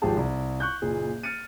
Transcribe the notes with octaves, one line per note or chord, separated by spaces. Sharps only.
G#1 F3 G4 G#4 A5
C2
C#6 F#6 G6
F#1 A#2 G#4
F6 A6 C#7 D#7